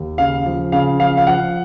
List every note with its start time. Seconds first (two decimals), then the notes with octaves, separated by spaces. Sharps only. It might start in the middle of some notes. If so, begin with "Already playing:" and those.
Already playing: D#2
0.18 C#3 F5
0.46 F3
0.72 C#3 F5
1.00 F3 F5
1.17 F5
1.27 F3 F#5